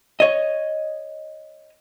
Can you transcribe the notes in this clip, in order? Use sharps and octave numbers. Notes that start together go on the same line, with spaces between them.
C#5 D#5